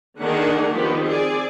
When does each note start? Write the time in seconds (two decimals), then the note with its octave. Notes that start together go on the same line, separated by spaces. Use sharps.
0.19 D3 D#3 A#3 D4 G#4 F#5
0.72 D#3 F3 B3 G4
1.04 C4 G#4 D5